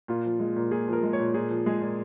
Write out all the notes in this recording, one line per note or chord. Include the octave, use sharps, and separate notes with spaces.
A#2 F4
F3
G#3
A#2
A#2 G#4
F3 A#4
G#3
C#5
A#2
A#2 G#4
F3
G#3 G#4
A#2